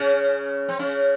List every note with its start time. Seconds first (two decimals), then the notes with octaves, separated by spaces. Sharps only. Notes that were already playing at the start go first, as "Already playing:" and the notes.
Already playing: C#3 C#4
0.69 C4
0.79 C#3 C#4